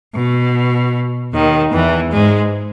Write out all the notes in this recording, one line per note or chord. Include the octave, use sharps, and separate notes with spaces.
B2
D#2 D#3
E2 E3
G#2 G#3